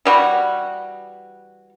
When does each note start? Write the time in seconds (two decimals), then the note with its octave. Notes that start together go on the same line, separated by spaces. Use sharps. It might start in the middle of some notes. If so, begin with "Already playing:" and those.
0.05 E3 G3 F#4